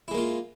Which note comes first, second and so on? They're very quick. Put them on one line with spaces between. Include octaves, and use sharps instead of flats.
E4 G#3 A#3 F4